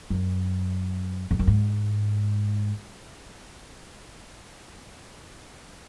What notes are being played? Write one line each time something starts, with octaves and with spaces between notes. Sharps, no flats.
F#2
F2
F#2
G#2